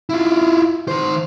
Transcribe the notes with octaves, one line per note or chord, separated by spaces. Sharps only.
E4 F4
D#3 C5